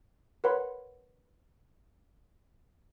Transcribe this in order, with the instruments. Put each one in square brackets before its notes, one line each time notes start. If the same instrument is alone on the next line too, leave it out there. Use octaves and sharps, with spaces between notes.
[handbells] A#4 B4 C#5 F#5 B5 C6